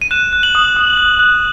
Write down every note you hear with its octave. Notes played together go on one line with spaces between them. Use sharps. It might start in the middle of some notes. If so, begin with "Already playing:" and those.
D#7
F#6 E7
F#6
F#7
D#6
D#6
F#6
F#6